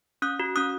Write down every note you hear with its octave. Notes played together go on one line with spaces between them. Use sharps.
C#4 D#6 F#6
F#4
C#4 D#6 F#6